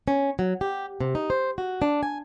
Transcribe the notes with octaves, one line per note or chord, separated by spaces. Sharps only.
C#4
F#3
G4
C3
D#4
C5
F#4
D4
G#5